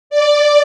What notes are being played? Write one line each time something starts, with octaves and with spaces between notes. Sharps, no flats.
D5